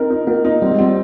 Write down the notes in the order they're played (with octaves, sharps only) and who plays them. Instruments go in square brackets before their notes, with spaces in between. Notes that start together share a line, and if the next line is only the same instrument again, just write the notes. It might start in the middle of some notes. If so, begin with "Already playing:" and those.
Already playing: [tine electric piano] C4 [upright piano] D#4 A#4
[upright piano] D#4
[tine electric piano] A#3 [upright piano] A#4
[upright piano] D#4
[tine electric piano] G3 [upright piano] C4
[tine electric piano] G#3
[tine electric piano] G3 [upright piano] C4